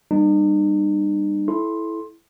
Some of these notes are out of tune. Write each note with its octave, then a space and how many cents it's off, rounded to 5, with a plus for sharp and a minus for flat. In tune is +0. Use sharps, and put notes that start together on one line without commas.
G3 +15 A#3 +30 D#4 -45
E4 +0 A4 -25 C6 +10